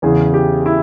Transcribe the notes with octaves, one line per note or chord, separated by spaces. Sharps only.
E2 C#3 E3 G#4
G4
E4